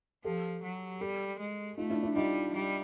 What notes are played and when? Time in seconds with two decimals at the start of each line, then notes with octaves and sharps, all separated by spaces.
0.24 F3 G4 A4
0.63 F#3
1.01 G3 G4 A4
1.40 G#3
1.77 A3 D#4 F4
1.90 D4 E4
2.03 D4 E4
2.16 G3 D#4 F4
2.54 G3